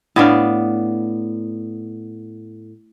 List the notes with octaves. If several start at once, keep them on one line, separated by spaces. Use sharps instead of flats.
A2 B3 D4 F5